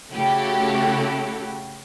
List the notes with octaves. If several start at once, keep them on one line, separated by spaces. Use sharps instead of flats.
C#3 A3 E4 F#4 G4 A4